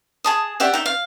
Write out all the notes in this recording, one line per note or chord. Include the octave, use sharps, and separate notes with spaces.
G#4 A5 D#6
G4 D5 E5 F#5
D#4 E5
F5